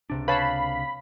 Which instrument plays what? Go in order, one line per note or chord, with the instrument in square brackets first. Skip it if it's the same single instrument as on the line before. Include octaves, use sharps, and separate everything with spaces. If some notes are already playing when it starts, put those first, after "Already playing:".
[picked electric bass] C#2 C3 D4
[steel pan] B4 C#5 A5 [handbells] F5 [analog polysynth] B5